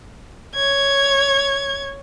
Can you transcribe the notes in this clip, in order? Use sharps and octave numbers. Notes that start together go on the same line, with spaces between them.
C#5 G#6